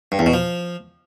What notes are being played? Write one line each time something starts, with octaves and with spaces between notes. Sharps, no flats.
G2
E2
B2
F3